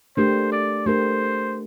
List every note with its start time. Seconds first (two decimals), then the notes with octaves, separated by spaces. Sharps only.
0.17 A3 D4 G4 A#4 C5
0.52 D5
0.86 A3 D4 G4 A#4 C5